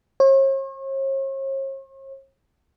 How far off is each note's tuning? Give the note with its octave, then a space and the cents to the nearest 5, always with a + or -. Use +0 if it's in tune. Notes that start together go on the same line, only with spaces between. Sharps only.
C#5 -45